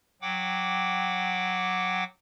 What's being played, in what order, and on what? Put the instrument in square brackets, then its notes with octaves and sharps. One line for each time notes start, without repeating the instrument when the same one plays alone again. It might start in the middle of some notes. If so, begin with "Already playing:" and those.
[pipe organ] F#3 F#5 G5 D6